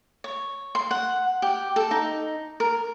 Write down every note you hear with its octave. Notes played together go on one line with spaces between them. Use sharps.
C#5
C6
F#5
G4
A4
D#4
A#4